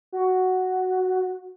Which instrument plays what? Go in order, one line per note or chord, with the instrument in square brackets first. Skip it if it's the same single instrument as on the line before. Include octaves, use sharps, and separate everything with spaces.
[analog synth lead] F#4